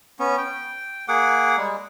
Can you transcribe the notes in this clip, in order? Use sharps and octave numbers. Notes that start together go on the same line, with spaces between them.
B3 C#4
G5
A#3 G#4 F#5 D6
G3 G#3